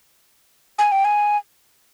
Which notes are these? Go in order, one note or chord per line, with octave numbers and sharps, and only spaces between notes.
G#5
G5
G#5